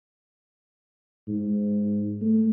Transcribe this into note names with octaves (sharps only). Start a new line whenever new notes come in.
G#2
A3